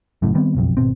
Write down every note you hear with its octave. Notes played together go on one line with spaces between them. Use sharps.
F#1 F#2 A2
D#3 G3 B3 C4
F#1 B1 F2
G#1 B2 C4